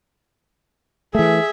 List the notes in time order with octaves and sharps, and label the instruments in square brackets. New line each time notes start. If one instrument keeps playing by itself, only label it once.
[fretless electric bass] E3 A3 [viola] G#4 E5